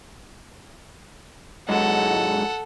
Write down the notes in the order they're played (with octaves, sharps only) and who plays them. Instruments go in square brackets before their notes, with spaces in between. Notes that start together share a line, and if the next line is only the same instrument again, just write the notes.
[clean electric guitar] G#2 F#3 G#3 [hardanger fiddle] A4 F#5